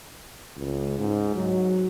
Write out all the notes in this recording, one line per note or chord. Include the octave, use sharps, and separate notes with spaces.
C#2
G#2
F#3